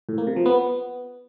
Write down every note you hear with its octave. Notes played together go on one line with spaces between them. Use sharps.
A2
A#3
C3
F3
B3